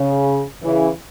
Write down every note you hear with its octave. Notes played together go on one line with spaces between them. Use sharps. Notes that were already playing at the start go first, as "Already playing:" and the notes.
Already playing: C#3
C#3 E3